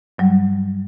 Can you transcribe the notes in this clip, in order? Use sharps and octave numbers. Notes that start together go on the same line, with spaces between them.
G2 F#3 G3